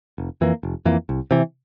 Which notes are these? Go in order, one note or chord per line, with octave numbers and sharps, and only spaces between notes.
F1
F2 E3 A#3
F1
F2 E3 A#3
C2
C3 E3